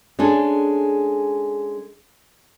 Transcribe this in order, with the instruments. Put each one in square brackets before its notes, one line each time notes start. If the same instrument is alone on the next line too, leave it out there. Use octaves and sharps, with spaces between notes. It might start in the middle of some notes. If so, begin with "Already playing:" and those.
[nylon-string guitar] G#3 C#4 D4 G#4 A4